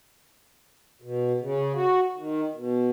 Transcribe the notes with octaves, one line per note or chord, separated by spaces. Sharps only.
B2
C#3
F#4
D#3
B2